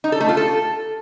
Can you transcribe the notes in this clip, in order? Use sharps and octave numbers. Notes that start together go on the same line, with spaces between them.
D#4
A4
A3
F4
A4